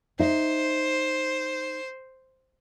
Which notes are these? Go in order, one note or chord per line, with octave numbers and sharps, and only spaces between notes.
D#4 C5 E5